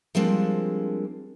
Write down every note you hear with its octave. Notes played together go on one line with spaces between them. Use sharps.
F3 G3 G#3 A#3 C4 D4